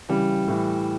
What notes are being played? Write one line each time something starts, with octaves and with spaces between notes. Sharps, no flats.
C#3 E3 G3
A2 E3